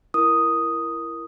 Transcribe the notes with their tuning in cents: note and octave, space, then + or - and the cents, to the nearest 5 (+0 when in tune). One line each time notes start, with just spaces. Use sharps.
E4 +20 A#4 +5 D#6 +0